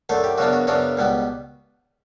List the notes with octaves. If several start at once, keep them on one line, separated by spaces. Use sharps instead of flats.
F#2 D3 A3 A4
G4
F#2 C#3 E3 B3 D4 F#4
F#4
F#2 C#3 E3 B3 D4 F#4
C#2 B2 G3 B3